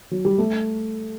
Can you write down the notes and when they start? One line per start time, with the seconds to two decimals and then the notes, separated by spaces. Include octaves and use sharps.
0.11 F#3
0.25 G3
0.38 A3